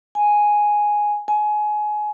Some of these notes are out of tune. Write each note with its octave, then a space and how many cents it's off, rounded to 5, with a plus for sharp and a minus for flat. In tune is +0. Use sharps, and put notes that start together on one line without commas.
G#5 +0
G#5 +25